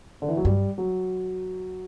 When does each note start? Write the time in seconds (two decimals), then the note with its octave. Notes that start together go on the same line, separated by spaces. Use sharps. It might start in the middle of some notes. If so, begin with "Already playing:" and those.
0.22 D3
0.28 E3
0.37 F#3
0.45 G2 G3
0.78 F#3